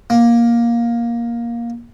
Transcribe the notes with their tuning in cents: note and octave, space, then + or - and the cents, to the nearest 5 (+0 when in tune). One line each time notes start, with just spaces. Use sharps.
A#3 +10